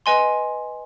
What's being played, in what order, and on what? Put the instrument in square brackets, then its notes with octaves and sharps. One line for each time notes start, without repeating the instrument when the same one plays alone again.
[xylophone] B4 D#5 G#5 C6